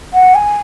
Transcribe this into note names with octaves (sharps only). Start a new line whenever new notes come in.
F#5
G#5